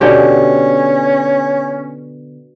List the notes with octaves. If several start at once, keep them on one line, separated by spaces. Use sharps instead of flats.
B2 D3 C#4 G4